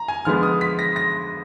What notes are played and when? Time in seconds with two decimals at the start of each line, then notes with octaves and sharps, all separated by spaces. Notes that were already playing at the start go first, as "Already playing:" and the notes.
Already playing: A#5
0.08 G#5
0.25 D3 F3 G#3 B3 F6
0.43 D#6
0.61 B6
0.79 A#6
0.96 A#6